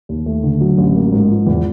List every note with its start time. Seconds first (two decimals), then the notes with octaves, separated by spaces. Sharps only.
0.09 D#2
0.26 A3
0.43 D3
0.61 F#3
0.78 A1
0.95 A#3
1.12 G#2
1.30 F3
1.46 E2